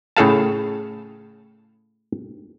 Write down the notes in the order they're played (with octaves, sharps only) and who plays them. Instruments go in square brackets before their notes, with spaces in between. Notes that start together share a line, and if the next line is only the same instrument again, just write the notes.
[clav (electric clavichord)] A2 C#3 G#4 A4 F5 A5